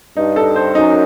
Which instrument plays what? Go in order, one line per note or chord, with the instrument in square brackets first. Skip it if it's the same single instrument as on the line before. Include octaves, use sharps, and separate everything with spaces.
[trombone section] G2 [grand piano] D#4
[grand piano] A4
C5
[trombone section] F#2 [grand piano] D#4